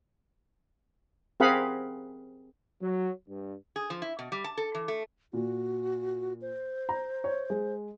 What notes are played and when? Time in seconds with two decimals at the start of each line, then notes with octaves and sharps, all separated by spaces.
1.40 C4 G#4 A#4 F5 F#5 B5
2.82 F#3
3.28 G2
3.76 G#4
3.90 F3
4.02 E4
4.19 B2
4.32 G3
4.44 A5
4.57 A4
4.75 E3
4.88 A3
5.33 A#2 F#4
6.42 C5
6.89 A#5
7.24 C#5
7.50 G#3